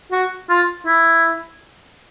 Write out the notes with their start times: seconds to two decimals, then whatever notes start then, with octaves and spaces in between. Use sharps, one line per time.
0.12 F#4
0.50 F4
0.86 E4